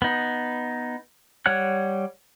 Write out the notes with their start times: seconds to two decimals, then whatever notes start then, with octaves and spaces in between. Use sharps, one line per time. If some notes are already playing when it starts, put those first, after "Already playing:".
0.02 B3 D#4
1.46 G3 C#5 F#5 F#6